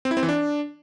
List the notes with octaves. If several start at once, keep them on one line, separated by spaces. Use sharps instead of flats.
C4
E4
C4
E3
D4